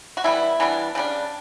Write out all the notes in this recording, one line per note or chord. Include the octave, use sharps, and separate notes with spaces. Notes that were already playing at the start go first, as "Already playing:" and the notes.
F#4
E3 G3 B3 E4
E3 G3 B3 D4
C#3 G3 D4